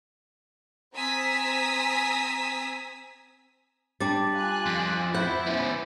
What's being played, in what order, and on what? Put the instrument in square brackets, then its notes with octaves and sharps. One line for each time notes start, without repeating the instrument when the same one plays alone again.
[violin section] C4 G#5 A#5 D#6 E6 B6
[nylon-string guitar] G3 D4 [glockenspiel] D6 A6
[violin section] F4 G#5 F#6
[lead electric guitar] F2
[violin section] E4 C5 [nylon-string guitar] F#5 [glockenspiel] G6
[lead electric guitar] B3 C#4